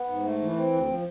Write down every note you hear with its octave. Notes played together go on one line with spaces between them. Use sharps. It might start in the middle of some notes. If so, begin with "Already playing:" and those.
Already playing: B3
G#2
A3
E3
C4
D2
F3